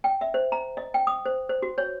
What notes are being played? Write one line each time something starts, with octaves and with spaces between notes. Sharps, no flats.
G5
E5
C5
A#5
D#5
G5
D#6
C5
C5
F#4
C#5